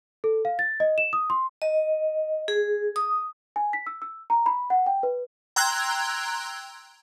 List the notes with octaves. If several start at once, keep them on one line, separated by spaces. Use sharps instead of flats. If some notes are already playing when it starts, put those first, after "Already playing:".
A4
F5
A6
D#5
E7
D#6
C6
D#5
G#4
D#6
G#5
B6
E6
E6
A#5
B5
F#5
G5
B4
G5 A#5 C6 E6 F#6 G#6